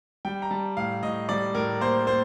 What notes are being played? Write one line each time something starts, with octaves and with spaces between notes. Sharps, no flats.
G3 G5
A#5
G3 A5
A2 F5
A2 D#5
G3 D5
A2 A#4
A#3 C5
A#3 C5